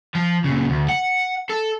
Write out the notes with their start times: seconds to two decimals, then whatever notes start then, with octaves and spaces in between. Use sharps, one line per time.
0.15 F3
0.44 A#2 C#3
0.70 D2
0.89 F#5
1.49 A4